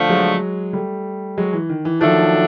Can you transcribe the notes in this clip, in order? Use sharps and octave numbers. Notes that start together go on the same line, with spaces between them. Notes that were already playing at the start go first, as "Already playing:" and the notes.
Already playing: D3 F3 A3
F#3 G#3
G3 A3
F#3 G#3
E3
D#3
E3
D#3 F3 F#3 A3 D4